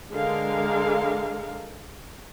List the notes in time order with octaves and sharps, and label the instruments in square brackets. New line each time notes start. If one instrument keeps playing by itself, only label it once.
[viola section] D3 G#3 A#4 F5